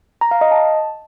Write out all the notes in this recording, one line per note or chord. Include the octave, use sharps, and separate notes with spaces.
A#5
F5
D#5
A5